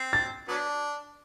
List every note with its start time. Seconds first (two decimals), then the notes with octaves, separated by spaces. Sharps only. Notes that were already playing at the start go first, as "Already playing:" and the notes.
Already playing: C4
0.13 A6
0.48 F#3 B3 D4